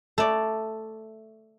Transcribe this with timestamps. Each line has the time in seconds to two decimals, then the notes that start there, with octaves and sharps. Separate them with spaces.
0.18 A3 D5